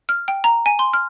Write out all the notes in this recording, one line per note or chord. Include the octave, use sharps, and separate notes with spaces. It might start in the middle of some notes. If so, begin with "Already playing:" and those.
F6
G5
A#5
G#5
C6
F6